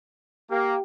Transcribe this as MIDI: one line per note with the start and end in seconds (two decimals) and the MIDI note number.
0.51 0.76 58
0.51 0.82 67